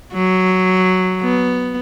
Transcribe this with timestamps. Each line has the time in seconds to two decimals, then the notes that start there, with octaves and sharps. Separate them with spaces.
0.14 F#3
1.22 B3